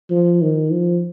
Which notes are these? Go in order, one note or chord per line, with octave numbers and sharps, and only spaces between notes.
F3
D#3
F3